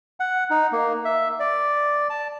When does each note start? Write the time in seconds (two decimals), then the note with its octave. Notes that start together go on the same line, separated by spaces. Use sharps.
0.20 F#5
0.51 D#4
0.72 A#3
1.05 E5
1.40 D5
2.10 A5